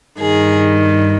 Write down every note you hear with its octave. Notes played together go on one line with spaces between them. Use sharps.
G2 D#3 G#4